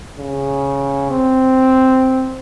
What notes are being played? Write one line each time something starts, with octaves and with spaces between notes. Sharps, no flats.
C#3
C4